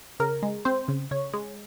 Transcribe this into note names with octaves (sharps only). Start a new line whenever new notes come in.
C#3 A#4
G#3
C4 C5
C#3
C#3 C#5
G#3